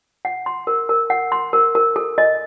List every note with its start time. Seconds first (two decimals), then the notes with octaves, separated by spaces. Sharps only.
0.25 F#5
0.46 C6
0.67 A#4
0.89 A#4
1.10 F#5
1.32 C6
1.53 A#4
1.75 A#4
1.96 A4
2.18 D#5